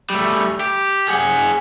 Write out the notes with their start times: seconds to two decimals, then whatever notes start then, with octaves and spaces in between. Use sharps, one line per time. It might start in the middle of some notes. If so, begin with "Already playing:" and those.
0.10 G3 A3
0.61 G4
1.08 G#4 F#5